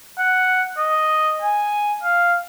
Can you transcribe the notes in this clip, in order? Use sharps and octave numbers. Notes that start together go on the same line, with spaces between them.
F#5
D#5
G#5
F5